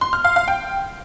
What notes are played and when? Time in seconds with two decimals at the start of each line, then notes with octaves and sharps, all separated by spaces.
0.01 C6
0.13 F6
0.25 F5
0.36 F5
0.48 G5